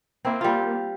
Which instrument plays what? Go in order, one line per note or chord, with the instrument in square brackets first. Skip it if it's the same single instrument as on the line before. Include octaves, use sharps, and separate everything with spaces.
[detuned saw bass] A#3 [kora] C4 E4
[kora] G3 F4